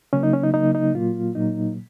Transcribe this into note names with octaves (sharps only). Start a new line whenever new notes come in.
C#3 F#3 A#3 C#4
D#4
C#4
D#4
C#3 F#3 A#3 D#4
D#4
A#2 F#3 A#3 F4
A#2 F#3 A#3 D#4